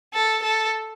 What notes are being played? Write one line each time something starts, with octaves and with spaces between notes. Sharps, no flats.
A4
A4